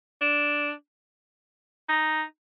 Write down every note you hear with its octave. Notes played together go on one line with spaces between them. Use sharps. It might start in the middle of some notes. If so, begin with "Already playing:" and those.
D4
D#4